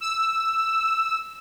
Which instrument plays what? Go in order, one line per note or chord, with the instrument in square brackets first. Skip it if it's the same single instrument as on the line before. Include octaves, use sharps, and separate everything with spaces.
[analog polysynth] E6